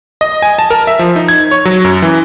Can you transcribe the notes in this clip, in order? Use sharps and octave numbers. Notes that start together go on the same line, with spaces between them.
D#5
G#5
A5
A#4
E5
F3
D#4
G#6
C#5
F#3
F#2
E3